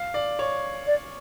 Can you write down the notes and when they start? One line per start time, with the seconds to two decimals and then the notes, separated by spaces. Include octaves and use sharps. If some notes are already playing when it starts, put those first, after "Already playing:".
Already playing: F5
0.14 D5
0.39 C#5
0.87 D5